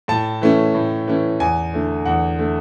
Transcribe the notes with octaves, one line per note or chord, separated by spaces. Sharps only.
A2 A5
E3 A3 C#4
A2
E3 A3 C#4
E2 G#5
D3 A3
E2 F#5
D3 A3